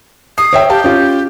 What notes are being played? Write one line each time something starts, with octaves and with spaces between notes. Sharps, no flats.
D#6 C7
C#5 E5 G5
G4 F5 A5
C#4 F4